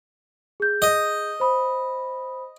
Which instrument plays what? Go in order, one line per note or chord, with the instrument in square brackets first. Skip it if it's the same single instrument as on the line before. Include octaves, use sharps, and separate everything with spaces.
[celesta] G#4 G6
[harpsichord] D#5
[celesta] C5 B5 D#6